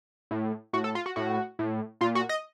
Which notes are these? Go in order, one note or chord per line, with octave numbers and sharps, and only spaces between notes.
A2
A2 F#4
A4
F4
F#4
A2 F#4
A2
A#2 F4
F#4
D#5